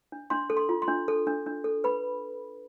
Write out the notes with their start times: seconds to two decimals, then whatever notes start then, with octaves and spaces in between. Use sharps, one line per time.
0.12 D4
0.30 D4 C6
0.50 A4
0.57 C6
0.69 F4
0.82 C6
0.88 D4
1.08 A4
1.27 D4
1.46 D4
1.64 A4
1.84 B4 B5